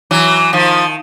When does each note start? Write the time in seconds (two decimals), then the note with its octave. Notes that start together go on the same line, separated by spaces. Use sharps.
0.11 E3 F#3
0.53 D#3 F3